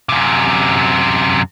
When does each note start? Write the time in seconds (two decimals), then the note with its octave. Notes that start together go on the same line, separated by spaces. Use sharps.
0.09 F#2 C3